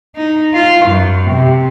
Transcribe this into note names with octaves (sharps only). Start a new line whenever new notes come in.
D#4
F4
F#2
C3